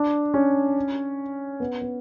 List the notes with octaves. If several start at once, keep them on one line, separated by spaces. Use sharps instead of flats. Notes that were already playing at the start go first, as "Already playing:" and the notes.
Already playing: D4
C#4
B3
B3